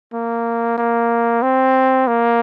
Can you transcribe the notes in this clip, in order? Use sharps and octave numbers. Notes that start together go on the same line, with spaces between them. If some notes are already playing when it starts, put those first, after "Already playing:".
A#3
A#3
C4
A#3